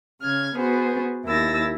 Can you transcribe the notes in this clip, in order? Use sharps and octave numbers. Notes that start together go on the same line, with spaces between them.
C#3 F6 G#6
B3 F#4 G#4 C5
D#2 E4 A#4 E6 A6 A#6